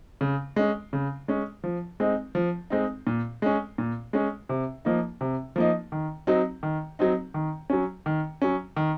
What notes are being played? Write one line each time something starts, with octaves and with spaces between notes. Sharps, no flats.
C#3
G#3 C#4
C#3
G#3 C#4
F3
G#3 C4 D#4
F3
G#3 C4 D#4
A#2
G#3 C#4
A#2
G#3 C#4
C3
F3 A#3 D#4
C3
F3 A#3 D#4
D#3
F#3 C4 D#4
D#3
F#3 C4 D#4
D#3
F#3 C#4
D#3
F#3 C#4
D#3